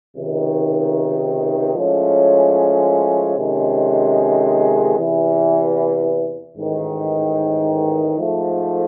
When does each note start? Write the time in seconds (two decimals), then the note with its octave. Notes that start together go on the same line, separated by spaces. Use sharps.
0.14 C#2 C3 D#3
1.75 A2 F3 G#3 C#4
3.36 F2 C3 D#3 G#3 C#4
4.96 E2 C3 E3
6.56 A1 G#2 D#3
8.16 G#2 F3 A3